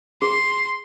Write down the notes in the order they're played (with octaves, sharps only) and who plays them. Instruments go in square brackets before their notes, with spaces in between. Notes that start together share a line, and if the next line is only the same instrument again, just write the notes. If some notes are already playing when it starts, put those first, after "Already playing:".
[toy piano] G#4 [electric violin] C6